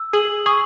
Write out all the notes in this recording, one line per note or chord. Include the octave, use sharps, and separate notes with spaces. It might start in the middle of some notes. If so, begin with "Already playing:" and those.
Already playing: E6
G#4 F#7
G#4 C#6